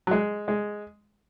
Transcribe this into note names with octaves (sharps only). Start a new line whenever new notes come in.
F#3
G#3
G#3